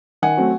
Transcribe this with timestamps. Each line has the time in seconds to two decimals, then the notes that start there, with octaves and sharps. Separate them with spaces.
0.22 D#3 F#5 G#5
0.37 F#3 A3 C4